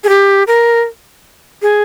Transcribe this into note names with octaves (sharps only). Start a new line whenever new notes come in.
G#4
G4
A#4
G#4